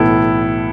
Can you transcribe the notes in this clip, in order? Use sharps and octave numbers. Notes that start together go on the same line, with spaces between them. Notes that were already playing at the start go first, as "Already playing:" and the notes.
Already playing: B1 A2 E3 B3 E4 A4